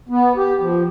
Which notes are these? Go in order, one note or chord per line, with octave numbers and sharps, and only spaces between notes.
B3
G4
F3